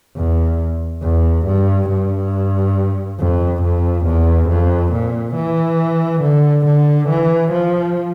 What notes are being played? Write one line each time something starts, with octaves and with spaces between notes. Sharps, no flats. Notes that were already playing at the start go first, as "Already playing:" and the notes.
E2
E2
G2
G2
F2
F2
E2
F2
A#2
E3
D3
D3
E3
F3